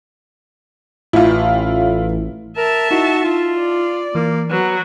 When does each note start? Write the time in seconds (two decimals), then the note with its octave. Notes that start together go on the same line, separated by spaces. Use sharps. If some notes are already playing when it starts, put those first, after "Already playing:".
1.13 A1 E4 F4
2.57 A#4 E5 A5
2.91 D#4 E4 F#4
3.24 F4
3.58 D5
4.15 E3 A#3
4.50 F#3 B3